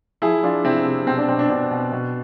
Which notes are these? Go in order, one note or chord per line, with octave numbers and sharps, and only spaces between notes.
F3 E4 G#4
F3 D4 F4
C3 C4 E4
C3
B2 C4
D4
B2 C4
D4
B2 D4
B2
B2